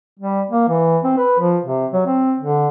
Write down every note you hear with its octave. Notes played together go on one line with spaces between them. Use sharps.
G3
A#3
E3
C4
B4
F3
C3
F#3
C4
D3